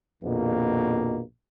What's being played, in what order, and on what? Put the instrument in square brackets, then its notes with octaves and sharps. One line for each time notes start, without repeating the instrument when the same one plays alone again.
[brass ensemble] A#1 F2 B2 D#3 A#3